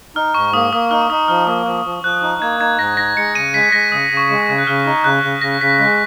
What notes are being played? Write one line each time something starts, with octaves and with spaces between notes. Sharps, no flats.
D#4 F6
G#2 C#6
A#3 D#6
A#3 D#6
D#4 F6
C#6
D#4 D#6
F3 F6
A#3 D#6
F3 F6
F3
F3 F#6
D#4
A#3 G#6
D#4 G#6
G#2 A#6
D#4 A#6
G#3 C#7
C#3 D#7
G#3 B6
G#3 A#6
C#3 D#6
C#3
C#6
G#3
C#3 G#6
F#6
C#3 F6
D#4
C#3 F#6
C#3
C#3 A#6
C#3 B6
G#3 B6